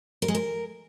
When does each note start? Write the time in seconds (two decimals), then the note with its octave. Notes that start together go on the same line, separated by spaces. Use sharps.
0.22 A#4
0.28 G#3
0.35 A#4